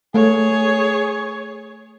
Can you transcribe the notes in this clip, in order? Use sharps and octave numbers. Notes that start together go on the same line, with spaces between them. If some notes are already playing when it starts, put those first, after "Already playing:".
A3 G#4 C#5